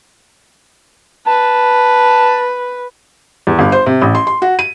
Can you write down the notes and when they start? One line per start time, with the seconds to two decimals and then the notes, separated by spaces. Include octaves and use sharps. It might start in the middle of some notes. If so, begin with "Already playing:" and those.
1.27 B4 A5
3.47 E2
3.59 G1
3.72 C5
3.86 C3
4.02 A1
4.15 C6
4.27 C6
4.42 F#4
4.59 D#7